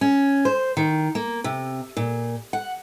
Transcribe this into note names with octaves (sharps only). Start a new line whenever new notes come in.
C#4
C5
D#3
A#3
C3
A#2
F#5